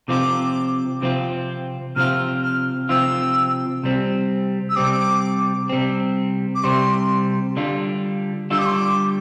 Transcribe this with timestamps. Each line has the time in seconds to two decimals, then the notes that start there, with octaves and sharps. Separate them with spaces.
0.08 C3 F3 C4 F4 D6
1.02 C3 F3 C4 F4
1.96 C3 F3 C4 F4 F6
2.43 F6
2.89 C3 F3 C4 F4 E6
3.83 C3 G3 C4
4.70 E6
4.76 C3 G3 C4 D6
5.69 C3 G3 C4
6.55 D6
6.64 C3 G3 C4 C6
7.56 D3 G3 D4 F4
8.50 D3 G3 D4 F4 E6
8.59 D6
8.66 C6
8.74 D6